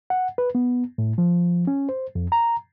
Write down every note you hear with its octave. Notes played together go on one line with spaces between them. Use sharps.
F#5
B4
B3
A2
F3
C#4
C5
F2
A#5